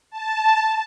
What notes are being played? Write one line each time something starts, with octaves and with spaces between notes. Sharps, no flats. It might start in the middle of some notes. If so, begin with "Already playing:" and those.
A5